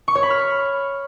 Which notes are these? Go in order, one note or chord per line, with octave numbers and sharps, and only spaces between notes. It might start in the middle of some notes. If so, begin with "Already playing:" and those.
C#6
C#5
B5
F6